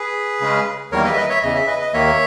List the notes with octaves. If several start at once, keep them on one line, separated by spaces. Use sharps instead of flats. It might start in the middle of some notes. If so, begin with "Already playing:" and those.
Already playing: G#4 B4
C#3 G#3 C#4
E2 D#3 G3 A#3 A#4 C#5
B4 D#5
E5
B4 D#5
C#5 E5
E2 C#3 E3 D#5
E5
B4 D#5
D#5
D#2 D#3 A#3 C#5 E5